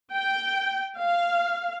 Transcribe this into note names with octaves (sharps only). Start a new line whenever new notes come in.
G5
F5